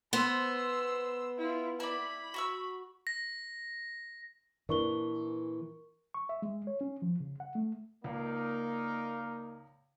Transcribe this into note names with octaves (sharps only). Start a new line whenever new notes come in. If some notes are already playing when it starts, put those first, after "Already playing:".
B3 C5 C6 E6
E4 F4
E4 D5 B5
F#4 C#6 E6
A#6
A#2 E3 D4 A#4 C#6 G7
C#6
E5
G#3
C#5
C#4
F3
C#3
F#5
A3
C#2 A#3 D#4 A#4 D5 F5